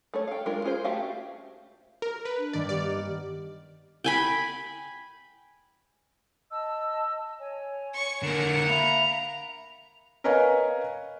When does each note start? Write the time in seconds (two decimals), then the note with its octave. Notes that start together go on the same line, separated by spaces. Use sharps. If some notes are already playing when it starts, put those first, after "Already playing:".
0.14 A3 A4 C#5
0.28 F5 G5
0.46 G#3 D4 F4 A#4
0.65 C#4 F4 G#4 C5
0.84 A3 F#4 G4 E5 F5
2.02 A#4
2.25 B4
2.38 D4
2.53 G2 D#3 A#3 D5
2.69 B3 G4 D5 F6
4.04 G5 G#5 B5
6.51 D#5 A5 E6
7.39 C#5 G#5
7.93 C#6
8.22 D3 A#3 A#4 F#5
8.68 E5 F5 A#5 B5
10.24 A#4 B4 C#5 D#5 F5 G#5